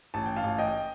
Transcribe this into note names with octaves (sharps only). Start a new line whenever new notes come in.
A1 A5
G5
F5 A5
A1
D#5 G5